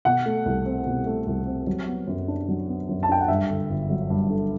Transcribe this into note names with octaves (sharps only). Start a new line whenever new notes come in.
B2 F#5
A3
C2
C4
B2
A3
C2
C4
F#3
B3
F#2
D4
F#3
B3
F#2
A5
D4 G5
F#5
G2 E5
D3
G1
F#3
G2
D3